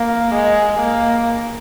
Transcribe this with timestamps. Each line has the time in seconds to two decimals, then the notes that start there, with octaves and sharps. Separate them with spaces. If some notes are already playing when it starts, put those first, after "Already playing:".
Already playing: A#3
0.34 G#3
0.80 A#3